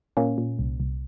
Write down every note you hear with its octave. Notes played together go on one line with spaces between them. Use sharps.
A#2 A#3 C#4
A#2
C2
C2